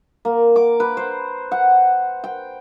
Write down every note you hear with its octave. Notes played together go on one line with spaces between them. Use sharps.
A#3
D6
B4
C5
F#5
G5